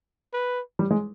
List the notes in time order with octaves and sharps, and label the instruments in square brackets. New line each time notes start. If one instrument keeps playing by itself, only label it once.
[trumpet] B4
[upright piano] G3
G#3